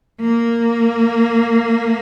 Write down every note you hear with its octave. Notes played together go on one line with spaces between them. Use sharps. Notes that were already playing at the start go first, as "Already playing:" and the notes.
A#3